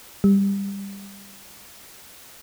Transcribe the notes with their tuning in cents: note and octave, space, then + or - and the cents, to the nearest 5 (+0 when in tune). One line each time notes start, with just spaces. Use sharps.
G3 +15